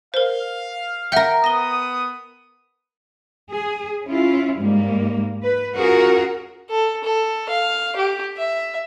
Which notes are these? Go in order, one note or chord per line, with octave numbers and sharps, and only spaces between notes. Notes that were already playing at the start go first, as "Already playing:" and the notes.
A#4 C5 F5
A#4 E5 F#5 G5
B3 D#6 A#6 G7
G#4
C#4 E4 F4
G#2 G3 G#3 A#3
B4
C#4 F4 F#4 G#4 A#4
A4
A4
F5
G4
E5